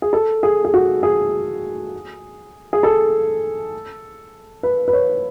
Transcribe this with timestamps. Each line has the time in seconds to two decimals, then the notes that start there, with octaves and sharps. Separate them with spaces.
0.02 G#4
0.13 A4
0.43 G#4
0.65 G#4
0.74 F#4
1.03 G#4
2.73 G#4
2.83 A4
4.63 B4
4.88 B4
4.93 C#5